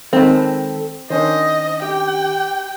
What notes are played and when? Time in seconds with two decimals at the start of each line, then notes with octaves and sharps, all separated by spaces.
0.13 D#3 G#3 C4 A4 A5 B5
1.10 D#3 C#4 D4 C5 D#5
1.82 G4 G5